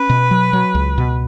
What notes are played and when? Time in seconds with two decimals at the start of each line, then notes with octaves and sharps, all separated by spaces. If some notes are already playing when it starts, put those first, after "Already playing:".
Already playing: C#4 B4
0.09 B2
0.31 F#3
0.53 F#3
0.75 C#2
0.98 B2